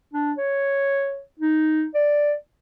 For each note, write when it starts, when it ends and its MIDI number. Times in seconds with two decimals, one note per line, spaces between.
0.13 0.32 62
0.38 1.21 73
1.39 1.85 63
1.95 2.34 74